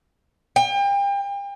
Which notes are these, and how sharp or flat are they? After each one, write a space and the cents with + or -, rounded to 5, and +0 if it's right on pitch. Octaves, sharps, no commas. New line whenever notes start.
G5 +35